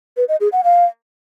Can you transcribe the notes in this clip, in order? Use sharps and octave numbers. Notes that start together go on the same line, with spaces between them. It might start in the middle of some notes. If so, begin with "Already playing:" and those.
B4
D#5
G#4
F#5
F5